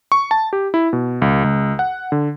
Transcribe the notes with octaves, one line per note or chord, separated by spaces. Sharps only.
C#6
A5
G4
E4
B2
C#2
C#2
F#5
D3